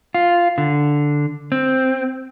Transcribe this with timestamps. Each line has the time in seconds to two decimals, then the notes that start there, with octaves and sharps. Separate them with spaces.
0.14 F4
0.58 D3
1.52 C4